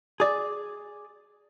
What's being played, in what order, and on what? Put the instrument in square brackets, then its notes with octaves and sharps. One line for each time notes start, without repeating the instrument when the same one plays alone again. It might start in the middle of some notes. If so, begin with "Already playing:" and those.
[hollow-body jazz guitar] G#4 D5